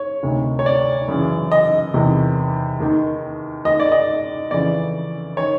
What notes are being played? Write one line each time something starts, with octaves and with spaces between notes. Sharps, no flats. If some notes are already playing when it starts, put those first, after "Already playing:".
Already playing: C#5
D2 C3 D#3
C#5
D5
F#2 C#3 E3
D#5
E2 C3 D#3
D#2 D#3
D#2 D#3 D#5
D5
D#5
F2 C#3 E3 D5
D#3 C#5